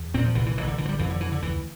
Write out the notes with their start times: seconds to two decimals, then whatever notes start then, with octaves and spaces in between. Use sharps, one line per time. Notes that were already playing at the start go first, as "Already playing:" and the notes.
Already playing: E2
0.14 A#2 C4
0.25 F3
0.35 C2 E3
0.46 E3
0.57 A1 E3
0.68 D3
0.78 D3 E3
0.85 F3
0.89 G3
0.99 F2 E3
1.10 D3
1.21 D3 E3
1.32 D3
1.42 D2 E3